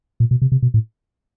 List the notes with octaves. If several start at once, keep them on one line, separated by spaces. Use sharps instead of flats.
A#2
B2
C3
C3
B2
A2